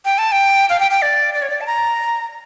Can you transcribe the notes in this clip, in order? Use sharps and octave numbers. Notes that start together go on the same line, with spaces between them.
G5
A5
G5
F5
G5
G5
D5
D5
C#5
D5
A5
A#5